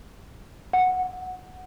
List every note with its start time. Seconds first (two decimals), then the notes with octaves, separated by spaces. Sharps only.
0.73 F#5